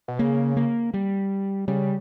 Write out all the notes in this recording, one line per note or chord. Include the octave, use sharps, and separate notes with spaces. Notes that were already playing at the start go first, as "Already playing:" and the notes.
B2
C#3 A#3
A#3
G3
C#3 G3